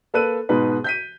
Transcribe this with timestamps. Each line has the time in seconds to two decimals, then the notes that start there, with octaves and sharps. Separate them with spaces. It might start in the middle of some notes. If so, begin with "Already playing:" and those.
0.14 A#3 A4 B4 E6 F#6 D#7
0.49 G#2 B2 G#3 B4
0.84 G6 B6 D#7